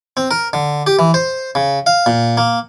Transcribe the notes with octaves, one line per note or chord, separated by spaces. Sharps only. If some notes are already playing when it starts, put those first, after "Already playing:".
C4
A#4
D3
G4
E3
C5
C#3
F5
A#2
A#3